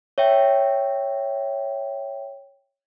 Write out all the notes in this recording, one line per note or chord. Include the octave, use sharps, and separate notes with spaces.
C#5 E5 G5